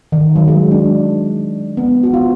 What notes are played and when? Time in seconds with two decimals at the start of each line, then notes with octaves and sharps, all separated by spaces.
0.12 D#3
0.35 F#3
0.48 G#3
0.71 D4
1.77 B3
2.03 F#4
2.14 F4